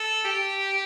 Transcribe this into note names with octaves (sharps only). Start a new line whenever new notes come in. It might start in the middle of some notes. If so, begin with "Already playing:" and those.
Already playing: A4
G4